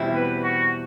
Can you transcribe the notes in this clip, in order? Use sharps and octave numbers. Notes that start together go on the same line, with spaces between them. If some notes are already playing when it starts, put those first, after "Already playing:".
Already playing: E2 B2 G3 C4 E4
B4
F#4